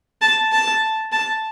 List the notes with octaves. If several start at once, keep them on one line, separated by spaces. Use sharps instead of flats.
A5
A5
A5